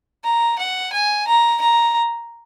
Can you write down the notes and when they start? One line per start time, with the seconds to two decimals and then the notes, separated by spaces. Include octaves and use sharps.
0.24 A#5
0.58 F#5
0.92 G#5
1.27 A#5
1.61 A#5